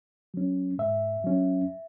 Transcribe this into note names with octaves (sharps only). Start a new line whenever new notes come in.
F#3 C#4
G#2 E5
F#3 C#4